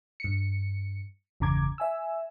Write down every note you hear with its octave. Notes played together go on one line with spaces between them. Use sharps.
G2 C#7
G1 E2 C#3 A#5 D6 G#6
E5 G#5 E6